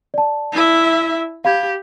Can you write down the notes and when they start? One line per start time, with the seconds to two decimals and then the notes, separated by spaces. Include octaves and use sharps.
0.14 D5 A5
0.52 E4 E5
1.45 G4 F5 B5 G#6